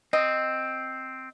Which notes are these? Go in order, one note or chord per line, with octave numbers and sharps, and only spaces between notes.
C4 D#5